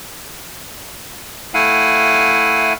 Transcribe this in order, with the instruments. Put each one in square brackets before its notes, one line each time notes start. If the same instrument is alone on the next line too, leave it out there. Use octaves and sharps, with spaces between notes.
[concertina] A3 E4 F5 F#5 G#5